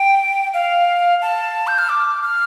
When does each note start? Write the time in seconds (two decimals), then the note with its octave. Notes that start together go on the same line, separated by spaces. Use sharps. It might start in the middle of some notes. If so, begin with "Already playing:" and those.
Already playing: G5
0.54 F5
1.22 A5
1.67 G6
1.78 F6
1.89 D6
2.23 F6